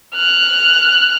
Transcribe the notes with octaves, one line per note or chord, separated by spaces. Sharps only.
F6 F#6